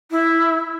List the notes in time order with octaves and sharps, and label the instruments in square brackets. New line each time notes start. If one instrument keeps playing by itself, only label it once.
[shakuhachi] E4